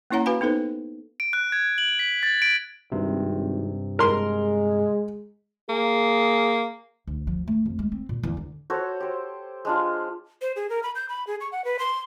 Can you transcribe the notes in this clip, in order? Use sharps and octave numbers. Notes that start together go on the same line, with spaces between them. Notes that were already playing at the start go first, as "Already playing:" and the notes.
A#3 C#4 E4 C#5 F#5 A#5
F#4 B4 F5 G#5 B5
B3 D#4 A4 B4 C5
D7
F#6
G#6
F#7
B6
A6
D7
G#1 G2 C3
G#3 A#4 C6
A#3 G#4
D2
F3
A3
F2
G#3
C4
A#2
E2
D3
F#4 A4 C5 C#5
G4 C5
G#3 D4 F4
C5
G#4
A#4
B5
G6
B5
G#4
C#6
F#5
B4
C6